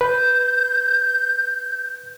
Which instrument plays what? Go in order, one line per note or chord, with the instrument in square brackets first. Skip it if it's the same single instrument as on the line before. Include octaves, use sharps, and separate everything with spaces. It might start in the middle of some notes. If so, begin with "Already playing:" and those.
[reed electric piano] B4 [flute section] G6